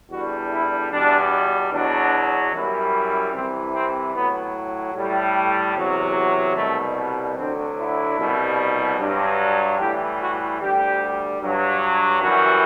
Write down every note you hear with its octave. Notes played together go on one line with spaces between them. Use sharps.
E2 D3 G3 F#4
E4
E2 B2 G3 D4
E2 B2 F#3 D4
F#2 E3 G3
C2 C3 E3 C4
C4
A2 F#3 B3
A2 G3
E2 C3 F#3
C2 B2 G3 A3
D2 D3 F#3 C4
E4
C2 B2 G3
G2 F#3
A2 E3 G3 G4
F#4
D2 D3 G3 G4
G2 F#3
F#2 E3 G3 F#4